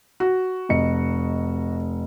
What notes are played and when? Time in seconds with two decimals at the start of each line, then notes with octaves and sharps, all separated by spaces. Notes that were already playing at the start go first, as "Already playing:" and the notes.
0.20 F#4
0.69 F1 D#5 C#7